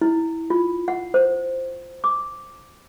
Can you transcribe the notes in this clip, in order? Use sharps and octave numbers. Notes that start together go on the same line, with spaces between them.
E4
F4
F#5
C5
D6